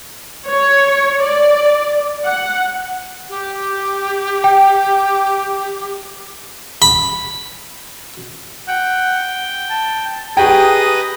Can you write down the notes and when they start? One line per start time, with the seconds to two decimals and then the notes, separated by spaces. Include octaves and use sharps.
0.47 C#5
1.21 D5
2.25 F#5
3.29 G4
4.44 G5
6.82 B5
8.68 F#5 G5
9.70 A5
10.37 G4 G#4 B4 D#5 G5 A5 A#5 A#6